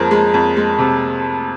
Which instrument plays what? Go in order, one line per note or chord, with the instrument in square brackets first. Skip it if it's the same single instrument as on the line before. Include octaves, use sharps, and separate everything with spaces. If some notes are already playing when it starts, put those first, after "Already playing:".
Already playing: [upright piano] F2 F3 G#3 A#4
G#3
F2
G#3
C3